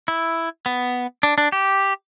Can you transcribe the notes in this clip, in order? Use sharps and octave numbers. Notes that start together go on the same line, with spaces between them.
E4
B3
D4
D4
G4